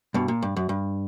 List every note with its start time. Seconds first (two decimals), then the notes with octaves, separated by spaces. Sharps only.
0.14 G2 B2
0.28 A#2
0.42 G2
0.56 F#2
0.69 G2